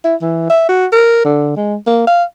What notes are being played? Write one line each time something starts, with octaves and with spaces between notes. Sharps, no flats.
E4
E3
E5
F#4
A#4
D3
G#3
A#3
F5